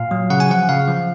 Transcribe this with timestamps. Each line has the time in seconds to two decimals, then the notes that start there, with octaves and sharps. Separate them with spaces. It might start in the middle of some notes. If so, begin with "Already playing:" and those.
Already playing: A#2 F5
0.11 F#3
0.30 C#3 F#5
0.40 G#5
0.49 F3 F#5
0.69 C#3 F5
0.88 F3